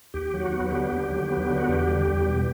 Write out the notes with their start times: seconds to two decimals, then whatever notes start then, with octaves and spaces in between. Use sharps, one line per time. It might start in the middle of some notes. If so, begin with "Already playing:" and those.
0.14 D#2 G4
0.34 F#3
0.40 F#4
0.53 B3
0.65 G4
0.72 D3
0.92 D#2
1.10 F#3
1.30 B3
1.50 D3
1.58 F#4
1.68 E2 G4
1.88 G3
2.07 E2
2.27 B2